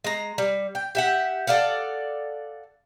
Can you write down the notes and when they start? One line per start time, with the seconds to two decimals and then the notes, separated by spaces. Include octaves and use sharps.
0.04 G#3 A#5
0.38 G3
0.75 G5
0.95 G4 E5 F#5
1.47 A4 D5 F5 F#5